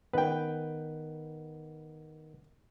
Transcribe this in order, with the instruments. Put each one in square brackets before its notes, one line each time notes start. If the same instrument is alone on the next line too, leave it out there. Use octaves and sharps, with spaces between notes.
[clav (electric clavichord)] D#3 B3 [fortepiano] B4 G5